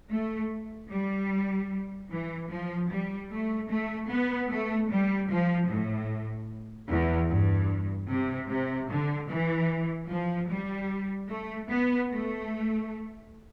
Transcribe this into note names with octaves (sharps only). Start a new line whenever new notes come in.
A3
G3
E3
F3
G3
A3
A3
B3
A3
G3
F3
A2
E2
G2
C3
C3
D3
E3
F3
G3
A3
B3
A3